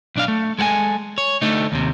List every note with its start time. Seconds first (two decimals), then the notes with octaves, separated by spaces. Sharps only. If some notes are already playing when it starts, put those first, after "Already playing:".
0.16 B1 D4 F5
0.28 A3
0.59 G#3 A4 F#5 G#5
1.18 C#5
1.42 D3 A3 D#4
1.72 D#2 C3